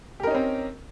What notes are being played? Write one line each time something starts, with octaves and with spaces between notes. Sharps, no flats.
C4 C#4 D#4 G4 A#4